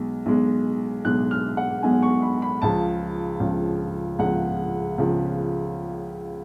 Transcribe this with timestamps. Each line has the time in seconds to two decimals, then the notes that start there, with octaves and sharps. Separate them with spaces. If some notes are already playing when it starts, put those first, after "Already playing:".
Already playing: B1 B2 G#3
0.26 B1 B2 G#3
1.05 B1 B2 G#3 F#6
1.31 F6
1.57 F#5
1.83 B1 B2 G#3 G#5
2.02 C#6
2.22 B5
2.42 B5
2.62 C#2 C#3 F3 A5
3.40 C#2 C#3 F3
4.19 C#2 C#3 F3 F#5
4.98 C#2 C#3 F3